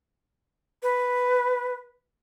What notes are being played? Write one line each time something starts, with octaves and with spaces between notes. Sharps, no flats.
B4